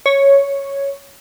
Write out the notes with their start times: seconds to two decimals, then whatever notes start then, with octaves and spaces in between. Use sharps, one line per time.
0.06 C#5